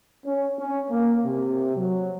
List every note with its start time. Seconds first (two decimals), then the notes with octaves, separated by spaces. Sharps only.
0.25 C#4
0.59 C#4
0.91 A#3
1.25 C3
1.77 F#3